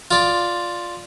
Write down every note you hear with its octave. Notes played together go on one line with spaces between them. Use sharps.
F4 D5